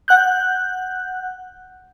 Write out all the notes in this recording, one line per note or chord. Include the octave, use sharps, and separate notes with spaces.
F#5 F#6 G6